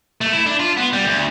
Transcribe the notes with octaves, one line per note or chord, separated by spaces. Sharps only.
A3
E4
D4
F4
B3
G3
D2